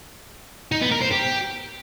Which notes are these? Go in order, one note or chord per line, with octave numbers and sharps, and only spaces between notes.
D#4
B3
A#4
C5
G4